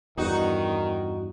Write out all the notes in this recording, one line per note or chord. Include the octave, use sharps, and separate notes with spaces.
E2 G2 D#3 D#4 F#4